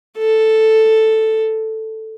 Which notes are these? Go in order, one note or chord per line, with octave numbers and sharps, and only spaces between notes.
A4